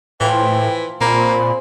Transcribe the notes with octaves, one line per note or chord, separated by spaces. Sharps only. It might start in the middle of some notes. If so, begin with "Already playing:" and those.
A2 E3 F3 F4 F5 G5
A#2 A#3 C4 G#4 B5